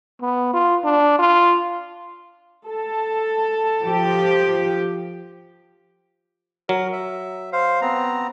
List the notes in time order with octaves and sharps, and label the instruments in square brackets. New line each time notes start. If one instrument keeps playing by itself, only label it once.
[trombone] B3
F4
D4
F4
[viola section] A4 A5
[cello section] F3 G4
[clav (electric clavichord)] F#3 [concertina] A#4
[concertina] E5
C5 F5
B3 C4 A#5